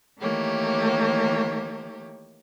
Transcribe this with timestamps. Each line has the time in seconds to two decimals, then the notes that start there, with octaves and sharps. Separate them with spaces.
0.20 D#3 E3 A3 A#3 G4 C#5